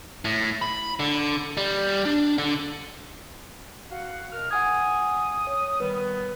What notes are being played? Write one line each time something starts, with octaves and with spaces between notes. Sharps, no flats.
A2
B5
D3
G3
D4
D3
F#4 F5 F#5
B2 A#4 F6
F#5 G#5 D#6 G#6
C#5
D#3 G3 B3 B4